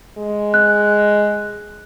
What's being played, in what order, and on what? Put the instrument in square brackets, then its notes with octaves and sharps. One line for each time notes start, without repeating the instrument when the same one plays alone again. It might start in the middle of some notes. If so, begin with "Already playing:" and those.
[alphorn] G#3
[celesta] F#6